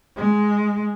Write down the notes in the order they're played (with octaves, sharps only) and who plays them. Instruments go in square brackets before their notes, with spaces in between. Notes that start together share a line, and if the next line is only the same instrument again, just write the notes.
[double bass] G#3